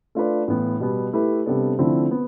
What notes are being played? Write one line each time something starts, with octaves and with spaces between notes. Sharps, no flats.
A3 D4 F4 B4 D5
A2 E3 B3
B2 G3 B3
A3 E4 G4 B4
C3 G3 B3 D4 A4
D3 F3 A3 C4 E4
B3